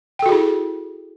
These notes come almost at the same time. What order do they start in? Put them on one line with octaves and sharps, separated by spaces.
G5 A4 F#4 G#4 E4